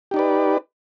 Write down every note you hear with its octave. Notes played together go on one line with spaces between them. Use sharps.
D#4 G4 B4 D5